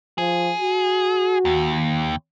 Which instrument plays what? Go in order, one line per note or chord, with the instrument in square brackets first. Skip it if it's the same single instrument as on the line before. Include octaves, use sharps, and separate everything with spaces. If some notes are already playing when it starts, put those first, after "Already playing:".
[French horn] F3 [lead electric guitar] G#4
[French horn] F#4
[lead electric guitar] D#2